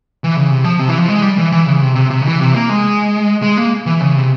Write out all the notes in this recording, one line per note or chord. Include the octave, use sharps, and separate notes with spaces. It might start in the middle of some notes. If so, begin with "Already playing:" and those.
E3
C#3
C3
F3
C3
E3
F3
G#3
G3
E3
E3
C#3
C3
C3
C3
C#3
E3
C3
A#3
G#3
G#3
A#3
E3
C#3
C3